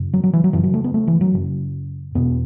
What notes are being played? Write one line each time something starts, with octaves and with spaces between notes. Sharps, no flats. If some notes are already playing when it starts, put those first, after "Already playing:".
Already playing: F#2 C#3
F#3
F#3
E3
F#3
F#2 C#3 E3
F#3
A3
B3
A3
E3
F#3
F#2 C#3
E2 B2 B3